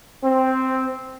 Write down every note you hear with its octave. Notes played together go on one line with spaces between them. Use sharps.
C4